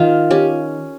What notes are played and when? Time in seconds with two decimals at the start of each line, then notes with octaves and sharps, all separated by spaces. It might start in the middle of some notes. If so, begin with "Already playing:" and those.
Already playing: D#3 F4
0.31 C#4 G4